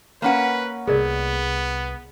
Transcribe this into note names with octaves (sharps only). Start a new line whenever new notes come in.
A#3 C#4 B4 F#5
C2 B3 G#4 A#4 D5